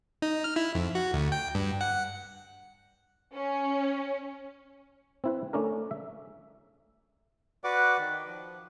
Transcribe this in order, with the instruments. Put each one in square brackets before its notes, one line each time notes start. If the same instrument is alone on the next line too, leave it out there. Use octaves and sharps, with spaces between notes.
[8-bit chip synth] D#4
F6
E4
F2
F#4
D2
G5
G2
F#5
[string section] C#4
[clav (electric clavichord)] C4 E4 B4
A3 C#4 D4 A#4
E5
[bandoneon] F#4 B4 D5 F#5 D6
D#3
F3